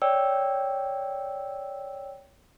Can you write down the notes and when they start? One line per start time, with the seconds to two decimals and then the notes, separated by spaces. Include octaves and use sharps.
0.02 C#5 D5 G5 E6